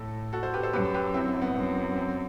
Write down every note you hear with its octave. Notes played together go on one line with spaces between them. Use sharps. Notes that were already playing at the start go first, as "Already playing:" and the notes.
Already playing: A2 A4
F#4 A4
A4 C5
G4 B4
A4 C5
F#2 G4 B4
G4 B4
C4 E4
B3
F#2
C4